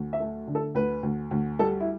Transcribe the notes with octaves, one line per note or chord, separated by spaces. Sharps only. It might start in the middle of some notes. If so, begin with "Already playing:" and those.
Already playing: D2
E5
A3
D3
A4
D2 B4
D2
D2
G3 A4
E4